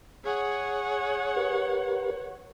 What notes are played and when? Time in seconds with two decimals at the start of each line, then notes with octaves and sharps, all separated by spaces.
0.24 G#4 C#5 F#5
1.36 G4 A#4 B4